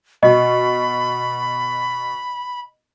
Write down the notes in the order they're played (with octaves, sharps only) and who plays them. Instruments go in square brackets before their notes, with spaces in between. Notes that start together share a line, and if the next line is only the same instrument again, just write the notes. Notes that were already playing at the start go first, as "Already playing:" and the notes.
[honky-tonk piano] B2 [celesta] D#5 [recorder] B5